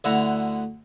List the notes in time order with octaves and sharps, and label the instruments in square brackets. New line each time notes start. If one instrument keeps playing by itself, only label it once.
[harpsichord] D2 D3 E4 F#5 A#5